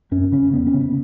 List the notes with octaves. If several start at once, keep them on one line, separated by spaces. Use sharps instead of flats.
F#2 C#4
C#3 C#4
E2 B3
C#4
C#3
B3